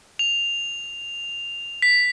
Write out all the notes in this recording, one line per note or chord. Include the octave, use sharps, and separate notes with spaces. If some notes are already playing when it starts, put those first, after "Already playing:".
F7
B6